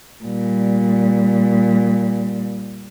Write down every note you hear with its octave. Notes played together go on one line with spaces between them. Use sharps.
A#2 G3